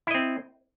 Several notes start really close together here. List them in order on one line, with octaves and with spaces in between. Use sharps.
E4 D#5 C4